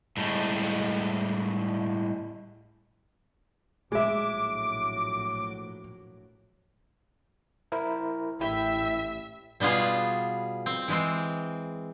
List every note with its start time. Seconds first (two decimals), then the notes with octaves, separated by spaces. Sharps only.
0.17 A2 G3 G#3
3.92 A#1 A2 F#3 G#3 E5 D6
7.72 E4 A#4 C5
8.41 A1 E4 G4 E5
9.60 B2 G3 B3 F4 G#4
10.66 C4
10.88 E3 G#3 C4